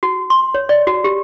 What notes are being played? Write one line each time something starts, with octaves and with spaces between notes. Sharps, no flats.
F#4
C6
C#5
D5
F#4
G4